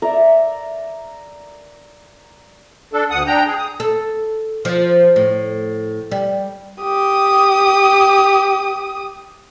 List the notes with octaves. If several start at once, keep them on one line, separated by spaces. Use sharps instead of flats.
A#4 D5 E5
D4 A4
D2 F#5 D#6
D4 G5 A#5
G#4
D#6
A4
F3
A2
G3
G4 D#6